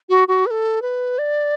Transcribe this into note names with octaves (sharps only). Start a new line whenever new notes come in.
F#4
F#4
B4
A4
B4
D5